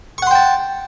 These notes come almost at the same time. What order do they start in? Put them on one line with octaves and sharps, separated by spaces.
C#6 F#5 C6 G5 A5